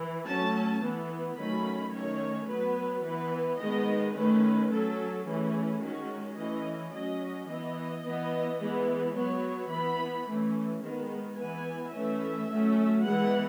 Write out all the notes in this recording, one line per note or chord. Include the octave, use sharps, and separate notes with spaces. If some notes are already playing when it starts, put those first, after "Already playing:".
Already playing: E3
F#3 A3 C#4 A5
E3 B3
D#3 F#3 A3 C#4 B5
D#3 A3 C#4 C#5
F#3 B3 B4
E3 B3 B4
D#3 G#3 B3 D#5
D#3 A3 C#4 B4
F#3 C#4 A4
E3 A3 C#4 G#4
D#3 G#3 C#4 F#4
E3 A3 C#4 D#5
F#3 C#4 D#5
E3 B3 D#5
E3 B3
E3 G#3 B3
F#3 B3 C#5
E3 B3 B5
E3 A3 C#4
D#3 G#3 B3
E3 B3 G#5
E3 A3 C#4 E5
F#3 A3 C#4
E3 G#3 B3 F#5